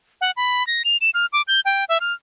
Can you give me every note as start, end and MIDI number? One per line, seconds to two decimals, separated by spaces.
0.21 0.31 78
0.37 0.66 83
0.67 0.83 94
0.85 0.97 101
1.01 1.10 100
1.14 1.26 89
1.33 1.42 86
1.48 1.60 91
1.65 1.84 79
1.89 1.98 76
2.00 2.13 89